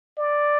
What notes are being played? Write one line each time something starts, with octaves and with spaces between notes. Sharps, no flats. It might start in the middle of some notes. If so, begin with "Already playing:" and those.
D5